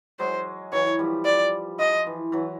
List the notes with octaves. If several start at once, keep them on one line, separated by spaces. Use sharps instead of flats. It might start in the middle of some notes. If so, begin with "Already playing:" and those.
F#3 G#3 C5
E3 F#3 C#5
F3 G3
D5
F3 D#5
E3
E3 F#3